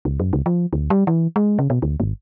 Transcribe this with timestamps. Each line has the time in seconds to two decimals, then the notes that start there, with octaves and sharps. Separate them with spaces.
0.05 C#2
0.20 F#2
0.33 C#2
0.46 F3
0.73 D2
0.90 G3
1.07 E3
1.36 G#3
1.59 C#3
1.70 B2
1.82 D2
2.00 G#1